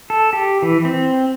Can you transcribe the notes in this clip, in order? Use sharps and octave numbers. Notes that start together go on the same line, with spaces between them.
A4
G4
E3
C4